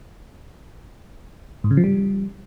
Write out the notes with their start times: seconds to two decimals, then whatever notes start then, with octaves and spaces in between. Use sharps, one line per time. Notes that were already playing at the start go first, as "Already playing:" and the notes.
1.64 G#2
1.71 C#3
1.77 F3
1.84 G3